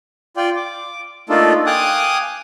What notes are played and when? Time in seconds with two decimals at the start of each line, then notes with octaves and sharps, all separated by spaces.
0.37 F4 D5 G5
0.56 D6
1.29 A3 A#3 D4 D#4 F4 A4
1.66 F5 G5 G#5 D6 D#6 F#6